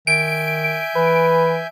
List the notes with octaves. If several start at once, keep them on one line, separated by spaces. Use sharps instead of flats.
D#3 E5 G#5 G6 D7
E3 B4